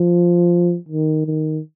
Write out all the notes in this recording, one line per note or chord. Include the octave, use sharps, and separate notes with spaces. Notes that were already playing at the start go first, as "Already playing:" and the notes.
Already playing: F3
D#3
D#3